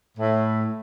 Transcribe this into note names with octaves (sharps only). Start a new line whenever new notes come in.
A2